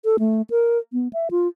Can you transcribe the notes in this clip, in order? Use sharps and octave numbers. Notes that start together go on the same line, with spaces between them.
A4
A3
A#4
B3
E5
F4